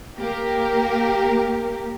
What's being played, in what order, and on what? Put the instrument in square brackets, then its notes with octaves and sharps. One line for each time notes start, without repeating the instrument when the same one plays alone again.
[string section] A#3 G4 A#4